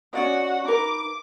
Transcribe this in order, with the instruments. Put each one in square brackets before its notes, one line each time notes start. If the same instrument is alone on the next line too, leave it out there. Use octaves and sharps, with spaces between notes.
[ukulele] C#4 D5 D#5 [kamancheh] F#4 F#5
[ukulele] D#4 A#4 B4 [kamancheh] D6